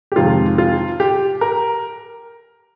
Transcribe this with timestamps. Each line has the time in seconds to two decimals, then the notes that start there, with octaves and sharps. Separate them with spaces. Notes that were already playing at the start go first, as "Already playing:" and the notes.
0.12 G4
0.16 F2 C3 D#3 G#3 F4
0.58 F4
1.00 G4
1.41 A#4